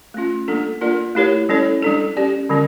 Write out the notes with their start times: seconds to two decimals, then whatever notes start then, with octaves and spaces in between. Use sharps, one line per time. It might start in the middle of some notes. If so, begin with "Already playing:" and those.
0.14 A3 C#4 F4
0.48 G3 A#3 D4 A4
0.81 A#3 D4 F4 A#4 D5
1.15 A3 E4 G4 A#4 C#5
1.49 G3 C#4 E4 A4 C#5
1.82 G3 D4 A4
2.17 C#4 G4 D5
2.49 D3 G3 C#4